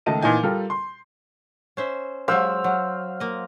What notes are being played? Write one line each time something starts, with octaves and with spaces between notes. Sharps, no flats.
C#2 D#3 A3 D#4 A5 D#7
A#2 E3 D#4 G#5 G6
G3 F4 A4 A#4
C6
C#4 C5 E5
F#3 G#3 G4 C5 F5 E6
F#3
A#3 D#5